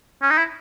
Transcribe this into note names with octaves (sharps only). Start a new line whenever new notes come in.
C#4
D#4
E4